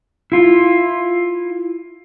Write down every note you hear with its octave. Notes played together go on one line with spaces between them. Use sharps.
E4 F4